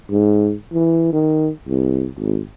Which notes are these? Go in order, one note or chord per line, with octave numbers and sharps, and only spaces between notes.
G#2
E3
D#3
C2
G#1